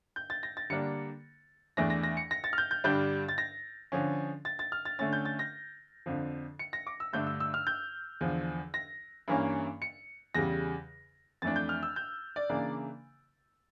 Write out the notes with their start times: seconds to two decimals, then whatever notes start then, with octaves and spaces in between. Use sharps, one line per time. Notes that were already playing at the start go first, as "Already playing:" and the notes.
0.16 G6
0.30 A6
0.43 A#6
0.57 A6
0.70 D3 G3 A#3 D4 C#7
1.77 E2 E3 A3 D4 A#6
1.90 A#6
2.03 A#6
2.17 C#7
2.31 A#6
2.44 A6
2.53 F6
2.58 G6
2.71 G6
2.84 G2 D3 G3 D4 G6
3.29 A6
3.38 A#6
3.92 D3 F3 C#4
4.45 A6
4.59 A6
4.72 F6
4.85 A6
4.99 D3 A3 C#4 A6
5.13 G6
5.25 A6
5.39 A#6
6.06 F2 D3 F3
6.59 C#7
6.73 A#6
6.87 D6
7.00 E6
7.13 G2 D3 A3 D4 G6
7.27 E6
7.40 E6
7.54 F6
7.67 G6
8.21 E2 D3 F3
8.74 A#6
9.28 G2 E3 A#3 C#4
9.82 C#7
10.34 E2 C#3 G3 A#6
11.42 F2 E3 A3 D4 A6
11.56 G6
11.69 F6
11.83 E6
11.96 G6
12.36 D5
12.49 C#3 E3 A#3 D4